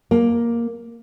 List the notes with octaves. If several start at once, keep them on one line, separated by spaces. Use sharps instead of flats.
A#3